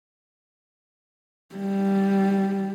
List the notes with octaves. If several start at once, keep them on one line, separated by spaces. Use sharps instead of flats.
G3